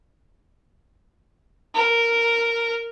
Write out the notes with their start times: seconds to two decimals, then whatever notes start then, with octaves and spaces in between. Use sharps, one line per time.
1.75 A#4